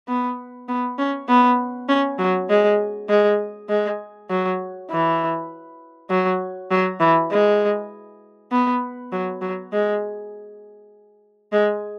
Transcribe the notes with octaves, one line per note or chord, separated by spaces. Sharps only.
B3
B3
C#4
B3
C#4
F#3
G#3
G#3
G#3
F#3
E3
F#3
F#3
E3
G#3
B3
F#3
F#3
G#3
G#3